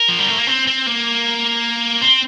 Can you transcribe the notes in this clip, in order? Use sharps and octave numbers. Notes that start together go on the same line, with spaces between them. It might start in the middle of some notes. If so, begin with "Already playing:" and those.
Already playing: A#4
F3
G3
A3
A#3
C4
C4
A#3
C4